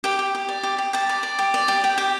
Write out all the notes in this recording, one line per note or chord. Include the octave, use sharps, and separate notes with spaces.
G4 G5
G4
G4
D5
G4
G4
G4 A5
D5
D5
G4
D5
G4
G4 G5
G4